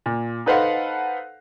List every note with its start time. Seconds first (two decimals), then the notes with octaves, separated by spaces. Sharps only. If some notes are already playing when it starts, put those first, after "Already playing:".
0.06 A#2
0.46 D#4 A4 B4 C5 F5 F#5